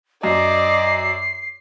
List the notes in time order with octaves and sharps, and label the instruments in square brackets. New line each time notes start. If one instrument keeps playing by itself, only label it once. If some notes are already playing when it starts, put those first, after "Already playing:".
[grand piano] F#2 [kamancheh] D5 [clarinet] D#5 [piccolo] C7